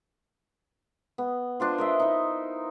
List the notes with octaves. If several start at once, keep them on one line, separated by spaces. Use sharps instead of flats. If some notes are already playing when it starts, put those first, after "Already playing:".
B3
D4 F4 C5
A#4 D#5 E5
D#4 E4